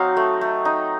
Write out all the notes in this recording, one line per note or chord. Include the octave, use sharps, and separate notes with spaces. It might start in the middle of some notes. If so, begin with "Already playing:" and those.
Already playing: F#3 C4 D#4 F5
A3
A3
D#4